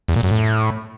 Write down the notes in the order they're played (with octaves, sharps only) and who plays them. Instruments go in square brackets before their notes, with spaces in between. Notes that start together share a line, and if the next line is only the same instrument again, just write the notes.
[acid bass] E2
A#2
F#2
A2